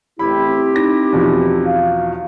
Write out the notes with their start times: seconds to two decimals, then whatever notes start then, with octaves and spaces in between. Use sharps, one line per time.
0.19 A1 C4 E4 G4 B5
0.76 D#4 A#6
1.13 E2 B2 F3
1.66 F5